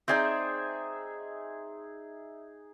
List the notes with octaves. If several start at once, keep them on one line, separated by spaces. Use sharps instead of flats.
C4 D#4 G#4 C5 D5 E5